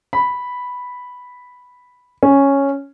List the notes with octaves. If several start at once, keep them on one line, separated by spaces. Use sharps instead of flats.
B5
C#4